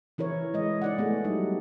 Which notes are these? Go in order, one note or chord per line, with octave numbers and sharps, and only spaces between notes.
E3 E4 A#4 C#5
G#3 D#5
E4 D5 F#5
A3 B3 G#4
F#3 G3 D#4